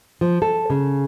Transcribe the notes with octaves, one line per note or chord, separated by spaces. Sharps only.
F3
A4
C#3